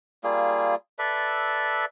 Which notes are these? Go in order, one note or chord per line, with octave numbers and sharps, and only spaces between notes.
G3 A#3 F4 G#4
A4 B4 D5 E5